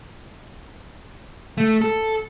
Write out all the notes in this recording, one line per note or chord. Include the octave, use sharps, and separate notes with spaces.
A3
A4